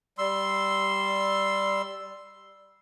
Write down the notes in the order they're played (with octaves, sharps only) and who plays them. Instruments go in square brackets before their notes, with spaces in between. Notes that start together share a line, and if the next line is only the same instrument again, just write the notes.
[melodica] G3 C6 E6